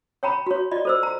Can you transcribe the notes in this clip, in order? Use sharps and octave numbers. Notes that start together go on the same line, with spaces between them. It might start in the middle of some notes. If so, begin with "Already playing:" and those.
C#5 G5 A#5 B5
F#4 C#5
F4 D5 D#5
A4 C5 E6
A#5